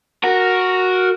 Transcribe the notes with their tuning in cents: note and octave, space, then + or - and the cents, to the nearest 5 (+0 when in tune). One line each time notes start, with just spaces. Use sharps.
F#4 -5 A#4 +0